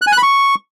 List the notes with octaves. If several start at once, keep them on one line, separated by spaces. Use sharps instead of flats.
F#6
G#5
F#6
B5
C#6